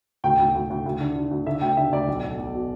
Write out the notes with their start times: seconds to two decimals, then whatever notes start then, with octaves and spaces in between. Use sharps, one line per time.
0.24 D2 G5
0.38 D2
0.55 D2
0.70 D2
0.86 D2
1.00 D3
1.16 D3
1.31 D2
1.46 D3 E5
1.61 D2 G5
1.77 D3 E5
1.92 D2 D5
2.08 B1
2.24 B1
2.39 B1
2.54 B2